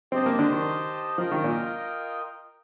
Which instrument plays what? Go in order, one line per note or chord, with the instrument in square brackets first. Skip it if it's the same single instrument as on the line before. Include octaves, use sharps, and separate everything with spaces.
[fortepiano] C4 [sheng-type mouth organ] G4 C5 D#5 A5
[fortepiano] A#3
D3
D#3
[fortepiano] F3 [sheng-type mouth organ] F4 A#4 D#5 G5
[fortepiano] D#3
A#2